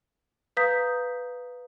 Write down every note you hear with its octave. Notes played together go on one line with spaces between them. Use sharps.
B4 F5 A#5 D#6 G6 B6